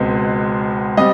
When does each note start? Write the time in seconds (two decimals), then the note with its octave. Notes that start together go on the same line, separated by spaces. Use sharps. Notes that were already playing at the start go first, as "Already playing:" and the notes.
Already playing: C#2 B2 G#3 C4
0.97 G3 C4 D#5